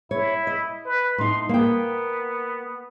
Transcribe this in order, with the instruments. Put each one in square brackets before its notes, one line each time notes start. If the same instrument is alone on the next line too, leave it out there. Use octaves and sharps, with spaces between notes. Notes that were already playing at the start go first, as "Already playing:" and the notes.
[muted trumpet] E4 [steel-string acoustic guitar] C#5
[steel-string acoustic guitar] D#5
[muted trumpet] B4
[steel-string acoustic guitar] A2 D#4 [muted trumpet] C6
[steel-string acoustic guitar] A#3 G5 [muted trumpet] B3